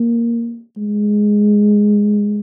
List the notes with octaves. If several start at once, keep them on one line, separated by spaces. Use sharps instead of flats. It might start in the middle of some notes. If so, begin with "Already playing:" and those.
Already playing: A#3
G#3